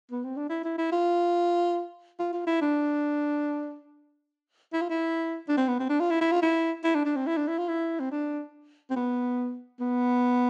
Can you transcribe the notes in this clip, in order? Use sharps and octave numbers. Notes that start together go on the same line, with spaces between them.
B3
C4
D4
E4
E4
E4
F4
F4
F4
E4
D4
E4
F4
E4
D4
C4
B3
C4
D4
F4
E4
E4
F4
E4
E4
D4
D4
C4
E4
D4
E4
F4
E4
C4
D4
C4
B3
B3